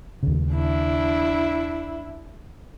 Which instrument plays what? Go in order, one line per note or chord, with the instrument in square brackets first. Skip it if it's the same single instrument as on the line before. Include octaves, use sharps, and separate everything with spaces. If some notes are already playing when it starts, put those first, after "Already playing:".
[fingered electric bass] D#2 C#3
[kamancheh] D4 E4